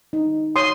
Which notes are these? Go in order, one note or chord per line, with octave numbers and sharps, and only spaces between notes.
D#4
C#5 C6 D#6